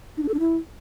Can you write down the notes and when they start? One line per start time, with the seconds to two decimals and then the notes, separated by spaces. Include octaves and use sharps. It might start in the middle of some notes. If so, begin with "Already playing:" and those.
0.17 D#4
0.23 D4
0.28 A4
0.34 D4
0.40 E4